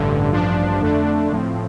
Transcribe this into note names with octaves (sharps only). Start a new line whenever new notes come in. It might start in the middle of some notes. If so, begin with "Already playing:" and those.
Already playing: A1 G2 D3
A1 G2 F3 D4
F2 D3 A3 D4
A2 F3 C4